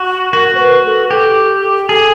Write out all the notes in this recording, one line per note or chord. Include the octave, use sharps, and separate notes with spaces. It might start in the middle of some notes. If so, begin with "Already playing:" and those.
Already playing: F#4
F#4 A#4
C5
B4
A4
G4 A4
G#4 A4